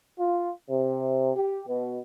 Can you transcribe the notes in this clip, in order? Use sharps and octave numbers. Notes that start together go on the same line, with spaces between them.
F4
C3
G4
B2